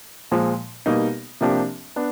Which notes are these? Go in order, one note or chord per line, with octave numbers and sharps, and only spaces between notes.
A#2 F3 G#3
B2 G3 A#3 D#4
C3 F3 A#3 D4 G4
B3 D4